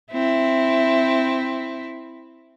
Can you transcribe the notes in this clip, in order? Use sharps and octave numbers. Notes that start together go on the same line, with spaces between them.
C4 E4